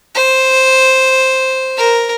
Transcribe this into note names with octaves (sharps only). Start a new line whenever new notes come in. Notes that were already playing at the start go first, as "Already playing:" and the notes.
C5
A#4